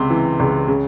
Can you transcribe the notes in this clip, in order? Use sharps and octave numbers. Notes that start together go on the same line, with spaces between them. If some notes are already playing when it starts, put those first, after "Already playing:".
Already playing: C#2 C3 C6
E3
C#2
C#3